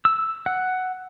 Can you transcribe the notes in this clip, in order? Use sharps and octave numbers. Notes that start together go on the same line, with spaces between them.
E6
F#5